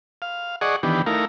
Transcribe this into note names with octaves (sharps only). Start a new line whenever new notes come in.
F5
G#4 D5 D#5 F#5 C#6
D#3 E3 B3 D4 G4
A3 D#4 E4 A#4 F5